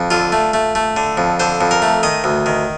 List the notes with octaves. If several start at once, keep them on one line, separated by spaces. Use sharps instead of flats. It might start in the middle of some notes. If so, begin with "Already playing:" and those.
Already playing: F2
D3 F4
A3
A3
A3
D3
F2
D3 C5
F2
A#4
A3
D#3 D#5
D2
D#3